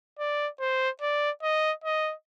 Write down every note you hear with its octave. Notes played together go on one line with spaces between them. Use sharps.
D5
C5
D5
D#5
D#5